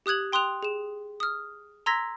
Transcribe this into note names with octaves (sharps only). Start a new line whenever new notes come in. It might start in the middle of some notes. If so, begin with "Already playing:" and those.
G4 D#6 F#6 G#6 F#7
G5 C6 D#6 F#6 F7
G#4 E7
D#6 F6
A#5 C6 E6 G#6 A#6 B6